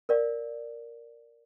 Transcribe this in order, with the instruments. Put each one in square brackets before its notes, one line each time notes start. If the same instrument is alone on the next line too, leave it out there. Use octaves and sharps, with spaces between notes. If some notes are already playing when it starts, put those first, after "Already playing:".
[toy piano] A#4 D5 F5